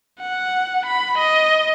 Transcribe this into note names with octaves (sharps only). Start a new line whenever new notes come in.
F#5
B5
D#5